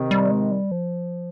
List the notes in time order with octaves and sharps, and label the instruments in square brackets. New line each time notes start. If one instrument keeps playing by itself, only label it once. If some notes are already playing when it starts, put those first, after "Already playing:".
Already playing: [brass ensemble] C3 D#3
[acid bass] G3
G#3
G3
F3